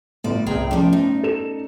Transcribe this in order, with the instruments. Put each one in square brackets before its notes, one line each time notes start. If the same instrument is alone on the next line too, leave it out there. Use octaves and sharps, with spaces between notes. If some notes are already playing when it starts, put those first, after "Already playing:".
[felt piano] G1 A2 [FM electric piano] A3 [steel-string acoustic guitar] D5
[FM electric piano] C2 C3 [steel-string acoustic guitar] G#4 G5 A#5
[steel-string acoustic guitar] F3 G3 [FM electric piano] A3 C#4 D5
[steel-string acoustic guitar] D#4
[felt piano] A4 E7